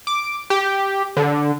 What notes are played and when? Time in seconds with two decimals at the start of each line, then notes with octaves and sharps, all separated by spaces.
0.07 D6
0.50 G4
1.17 D3